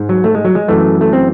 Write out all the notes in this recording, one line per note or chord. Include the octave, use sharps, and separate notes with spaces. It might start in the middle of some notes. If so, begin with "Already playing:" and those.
Already playing: G#2
F#3
A3
G#3
F#3
G#3
F#2 E3 A3
A3
C4